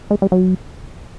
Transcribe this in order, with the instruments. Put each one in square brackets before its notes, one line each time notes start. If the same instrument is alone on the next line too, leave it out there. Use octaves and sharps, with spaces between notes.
[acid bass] G#3
G3
F#3